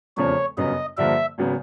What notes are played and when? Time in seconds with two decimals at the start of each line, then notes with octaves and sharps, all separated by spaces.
0.17 F1 E2 C#3 F3 C#5
0.57 G1 F#2 C#3 F#3 B3 D#5
0.98 G2 D3 F3 A#3 E5
1.38 G#1 C#3 F#3 B3